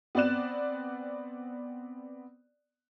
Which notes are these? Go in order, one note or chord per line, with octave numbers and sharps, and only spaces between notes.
B3 C4 D5 F#6 E7